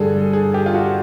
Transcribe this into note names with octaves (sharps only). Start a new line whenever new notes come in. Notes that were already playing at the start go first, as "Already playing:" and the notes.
Already playing: G2 D3 G3 G#4 A4
G#4
G4
F4
F#4